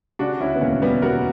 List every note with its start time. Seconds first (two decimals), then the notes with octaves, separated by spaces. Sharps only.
0.19 C#3 D4 F#4
0.40 D2 C#4 E4
0.56 B3
0.61 E1 A#3 C#4
0.82 E1 G3 B3
1.02 E1 F#4 A#4